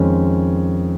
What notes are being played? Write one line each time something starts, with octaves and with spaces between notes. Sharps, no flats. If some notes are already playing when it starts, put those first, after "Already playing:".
Already playing: F2 D#3 G#3 C#4